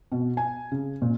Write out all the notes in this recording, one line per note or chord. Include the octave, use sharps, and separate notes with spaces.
B2
G#5
C#3
A#2